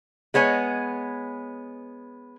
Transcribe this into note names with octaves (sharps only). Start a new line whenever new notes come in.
G#3 B3 C#5 G#5